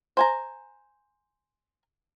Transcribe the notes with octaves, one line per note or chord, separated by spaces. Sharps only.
C5 G#5 A#5